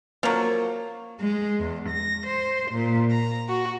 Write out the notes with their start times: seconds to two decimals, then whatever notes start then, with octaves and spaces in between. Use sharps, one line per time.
0.23 F3 F#3 A#3
1.19 G#3
1.60 E2
1.89 A#6
2.26 C5
2.71 A#2
3.11 A#5
3.48 F#4